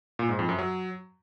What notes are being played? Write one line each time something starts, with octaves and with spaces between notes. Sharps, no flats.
A#2
G#2
F2
F#2
F#3